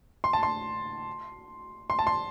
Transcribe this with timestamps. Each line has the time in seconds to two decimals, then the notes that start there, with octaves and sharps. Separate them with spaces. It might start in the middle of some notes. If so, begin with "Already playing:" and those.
0.24 C6
0.33 A5
0.43 C6
1.90 C6
1.99 A5
2.07 C6